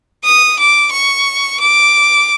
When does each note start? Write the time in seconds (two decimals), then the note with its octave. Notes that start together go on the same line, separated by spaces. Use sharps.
0.25 D#6
0.59 D6
0.92 C#6
1.60 D6